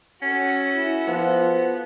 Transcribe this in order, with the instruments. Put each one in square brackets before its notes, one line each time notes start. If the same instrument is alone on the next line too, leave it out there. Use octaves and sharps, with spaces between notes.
[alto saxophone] C#4 [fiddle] F#4 A4
[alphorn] E4
[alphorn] F3 [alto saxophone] B3